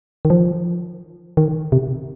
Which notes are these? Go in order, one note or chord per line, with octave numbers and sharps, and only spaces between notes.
D#3
F3
D#3
C3